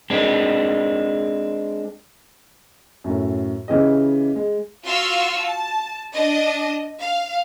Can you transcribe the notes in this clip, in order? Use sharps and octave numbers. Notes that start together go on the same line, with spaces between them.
G#3 C4 D4
F#2 A2
C#3 E3 G4 D#5
G#3
F4 F#4 F5 C6 C#6 E6
A5
D4 D#5
F5